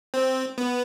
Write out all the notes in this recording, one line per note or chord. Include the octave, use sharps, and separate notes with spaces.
C4
B3